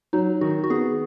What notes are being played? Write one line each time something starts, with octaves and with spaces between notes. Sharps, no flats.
F#3 D#4
D#3 F#4
F#4
B3 G#4